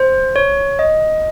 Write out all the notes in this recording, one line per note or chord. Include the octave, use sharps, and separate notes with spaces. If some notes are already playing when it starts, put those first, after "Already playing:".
Already playing: C5
C#5
D#5